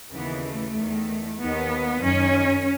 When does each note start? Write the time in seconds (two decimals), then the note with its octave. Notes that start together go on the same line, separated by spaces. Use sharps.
0.11 D#2 C#3 E3 B3
0.43 A3
0.75 E2 D#3
1.38 D#2 D#3 B3
2.00 F#2 D#3 C#4